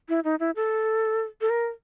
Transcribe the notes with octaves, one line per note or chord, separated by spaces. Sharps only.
E4
D#4
E4
A4
A4
A#4